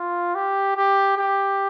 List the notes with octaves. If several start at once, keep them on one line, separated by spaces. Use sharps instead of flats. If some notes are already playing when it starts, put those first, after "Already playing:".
Already playing: F4
G4
G4
G4